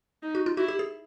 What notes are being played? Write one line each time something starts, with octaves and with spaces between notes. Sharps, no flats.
D#4
F#4
F4
E4 F#4
G4
G#4